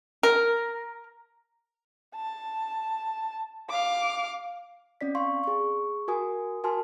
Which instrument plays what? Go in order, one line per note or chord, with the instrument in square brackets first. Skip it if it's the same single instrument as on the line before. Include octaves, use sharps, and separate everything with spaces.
[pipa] A#4
[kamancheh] A5
F5 D6
[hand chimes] C4 C#4 D5 B6
F5 C6 C#6
G#4 C#6
F#4 A#4 G#5 D#6
F#4 A#4 G#5 A5 C6 F6